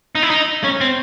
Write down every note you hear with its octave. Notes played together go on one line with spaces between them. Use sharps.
D#4
E4
D#4
C#4
C4